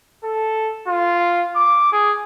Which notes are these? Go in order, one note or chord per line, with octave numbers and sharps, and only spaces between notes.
A4
F4
D6
G#4